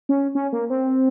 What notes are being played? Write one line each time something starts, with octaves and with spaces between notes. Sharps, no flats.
C#4
C#4
A#3
C4